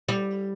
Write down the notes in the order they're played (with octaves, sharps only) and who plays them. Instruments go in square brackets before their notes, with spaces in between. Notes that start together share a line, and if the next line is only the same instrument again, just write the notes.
[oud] G3